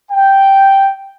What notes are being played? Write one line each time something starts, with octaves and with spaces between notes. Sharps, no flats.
G5